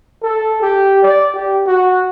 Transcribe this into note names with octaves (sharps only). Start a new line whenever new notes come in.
A4
G4
D5
G4
F#4